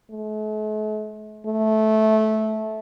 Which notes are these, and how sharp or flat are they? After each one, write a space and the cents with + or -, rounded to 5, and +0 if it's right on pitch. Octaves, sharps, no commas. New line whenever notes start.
A3 -45
A3 -15